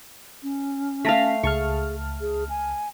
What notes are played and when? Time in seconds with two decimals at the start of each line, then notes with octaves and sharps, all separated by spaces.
0.43 C#4
1.05 A3 F5 A5 A#6 B6
1.43 C#2 G#4 A5 C#6 F6
2.21 G#4
2.49 G#5